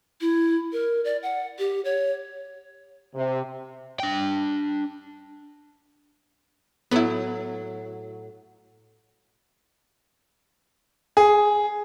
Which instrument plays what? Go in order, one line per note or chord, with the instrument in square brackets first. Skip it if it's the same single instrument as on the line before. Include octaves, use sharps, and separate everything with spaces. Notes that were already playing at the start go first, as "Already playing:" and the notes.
[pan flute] E4
A#4
D5
F#5
G4
C#5
[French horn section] C3
[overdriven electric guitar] D4 G5
[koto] A2 F#3 [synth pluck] B3 E4
[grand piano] G#4